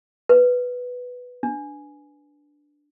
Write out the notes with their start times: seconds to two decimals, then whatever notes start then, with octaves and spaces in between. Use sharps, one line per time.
0.29 B4
1.43 D4